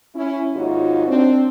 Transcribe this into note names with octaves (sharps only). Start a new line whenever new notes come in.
C#4 E4
D#2 G#2 D#4 F4 F#4 C#5
C4 D4